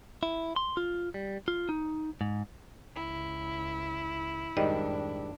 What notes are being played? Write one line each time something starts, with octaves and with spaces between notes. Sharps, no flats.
E4
C6
F4
G3
F4
D#4
G#2
C#2 E4
F2 G#2 D#3 G3 D4 D#5